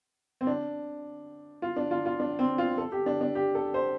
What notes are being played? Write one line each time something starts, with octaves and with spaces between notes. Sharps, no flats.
C4
D4
F4
D4
F4
F4
D4
C4
F4
A4
G4
D4
D4
G4
A4
C5